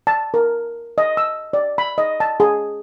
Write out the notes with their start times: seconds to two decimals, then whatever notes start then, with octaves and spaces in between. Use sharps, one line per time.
0.07 A5
0.34 A#4
0.98 D#5
1.17 E6
1.53 D5
1.78 B5
1.98 D#5
2.20 A5
2.40 G#4